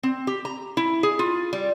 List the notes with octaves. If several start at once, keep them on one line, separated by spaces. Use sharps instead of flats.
C4
G4
A#5
E4
G#4
F4
G3